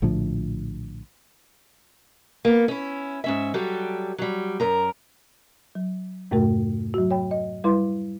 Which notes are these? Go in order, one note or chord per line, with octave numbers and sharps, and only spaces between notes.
A#1 A2 D3 F3
A#3 B3
C#4 E4
G#2 C#4 E5
F#3 G3 G4 A4
F#3 G3
F#2 A#4 A#5
F#3
F2 G#2 C3 A3 F#4 A#4
F#3 F#4
C#5 G5 B5
D#5
G3 E4 B4 C6